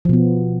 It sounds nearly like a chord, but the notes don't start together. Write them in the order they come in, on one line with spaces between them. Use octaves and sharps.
F3 B2 B3